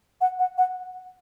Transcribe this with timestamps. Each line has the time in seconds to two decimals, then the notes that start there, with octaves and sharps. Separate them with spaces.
0.21 F#5
0.39 F#5
0.58 F#5